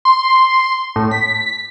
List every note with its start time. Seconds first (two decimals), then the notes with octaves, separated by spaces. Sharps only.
0.05 C6
0.96 A2
1.11 B6